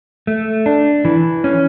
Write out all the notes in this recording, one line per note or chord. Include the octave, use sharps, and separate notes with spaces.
A3
D4
E3
C#4